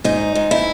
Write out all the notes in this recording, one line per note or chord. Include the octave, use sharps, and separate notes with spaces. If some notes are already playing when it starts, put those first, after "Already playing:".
G#2 D#4
G#2
E4